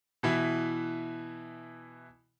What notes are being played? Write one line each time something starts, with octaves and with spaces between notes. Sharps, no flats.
B2 E3 E4